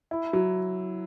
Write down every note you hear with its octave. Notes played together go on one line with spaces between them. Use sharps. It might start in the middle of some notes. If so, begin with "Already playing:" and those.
E4
F#3